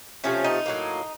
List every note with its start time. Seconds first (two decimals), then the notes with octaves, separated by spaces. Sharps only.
0.24 C3 F3 A3 C#4
0.44 D#4
0.66 A2 F#3 A#3